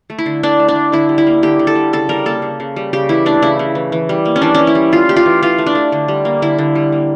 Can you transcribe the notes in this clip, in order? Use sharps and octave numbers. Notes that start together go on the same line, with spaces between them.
A3
E4
D3
D3 D4
A3
D4
A3
D3 E4
G3
E4
A#3
D3 G4
D3
A4
G3
C#3 A4
G3 A#4
A#3 A4
C#3
C#3
G3
C#3 G4
E3 E4
A3 D4
C#3 E4
C#3
E3
E3
G3
A#3
C#4
E3 D4
E3 C#4
E4
G3
A3 F4
A3 G4
F4
E3
E3 F4
A3
D4
A3
D3
G3
A#3
D3 E4
D3
G3
A#3